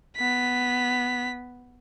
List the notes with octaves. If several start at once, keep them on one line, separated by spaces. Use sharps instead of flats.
B3 B6